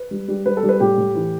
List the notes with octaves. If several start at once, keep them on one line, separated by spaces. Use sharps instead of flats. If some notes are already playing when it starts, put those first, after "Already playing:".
Already playing: B4
G3
G3
G3 B4
A4
G3
B4
A2 G4
A2
E3